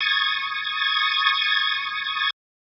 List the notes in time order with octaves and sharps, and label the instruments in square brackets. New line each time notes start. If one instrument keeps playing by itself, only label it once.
[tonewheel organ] C#6 D#6 G#6 A6